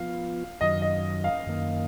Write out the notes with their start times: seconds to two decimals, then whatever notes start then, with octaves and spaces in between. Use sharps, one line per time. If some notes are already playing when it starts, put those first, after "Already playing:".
Already playing: F3 B3 F4 F5
0.61 F#2 D#3 F#3 D#5
0.82 D#5
1.24 F5
1.46 F#2 D#3 A#3